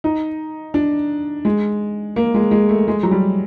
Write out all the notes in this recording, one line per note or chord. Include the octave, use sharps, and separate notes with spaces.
D#4
D4
G#3
A#3
G#3
G#3
A3
G#3
F#3
G3